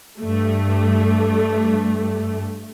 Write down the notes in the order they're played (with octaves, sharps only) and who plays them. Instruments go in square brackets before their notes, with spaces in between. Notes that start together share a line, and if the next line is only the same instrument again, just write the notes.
[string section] G2 A3